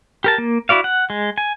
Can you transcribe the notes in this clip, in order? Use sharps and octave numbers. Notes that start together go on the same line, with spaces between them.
G4 A#4 A5
A#3
E4 F#4 D5 F5
F#5
G#3
G#5